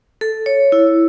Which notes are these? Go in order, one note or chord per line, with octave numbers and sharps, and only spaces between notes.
A4
C#5
E4